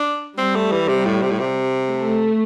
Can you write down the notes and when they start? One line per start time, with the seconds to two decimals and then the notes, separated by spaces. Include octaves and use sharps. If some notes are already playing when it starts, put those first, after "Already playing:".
Already playing: D4
0.38 G3 C4
0.56 A3
0.71 E3
0.89 C3
1.06 A2
1.22 C3
1.31 A2
1.39 C3
1.89 A3